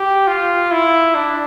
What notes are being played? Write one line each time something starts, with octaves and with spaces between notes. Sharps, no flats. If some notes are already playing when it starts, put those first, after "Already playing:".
Already playing: G4
F4
E4
D4